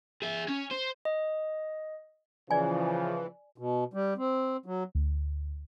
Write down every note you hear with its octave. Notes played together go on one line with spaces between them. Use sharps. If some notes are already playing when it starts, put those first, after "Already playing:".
G#4 E5
C#4
C5
D#5
C#3 E3 F3 D5 G#5
B2
G3
C4
F#3
D2